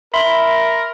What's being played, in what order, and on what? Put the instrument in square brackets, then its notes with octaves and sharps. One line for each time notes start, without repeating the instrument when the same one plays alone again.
[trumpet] A#4 [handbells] E5 B5 C6